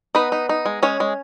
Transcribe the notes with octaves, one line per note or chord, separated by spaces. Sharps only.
B3 D#4 B4
D#4
D#4
G#3
G#3 C#4 C#5
G#3